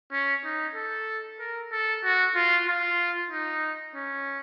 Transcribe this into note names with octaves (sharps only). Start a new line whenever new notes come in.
C#4
D#4
A4
A#4
A4
F#4
F4
F4
D#4
C#4